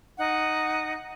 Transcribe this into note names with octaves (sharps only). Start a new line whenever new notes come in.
D#4 F#5